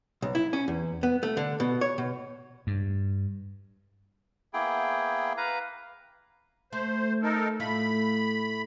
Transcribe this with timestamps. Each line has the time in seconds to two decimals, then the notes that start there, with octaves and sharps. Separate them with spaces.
0.22 B1
0.35 E4
0.53 C#4
0.68 E2
1.03 B3
1.23 A3
1.37 D3
1.60 B2
1.81 C#5
1.98 B2
2.67 G2
4.54 A#3 B3 E4 G#4 G5
5.37 B4 F5 A#5
6.73 A3 C5
7.23 D#4 A4 A#4
7.60 A2 A3 F4 B5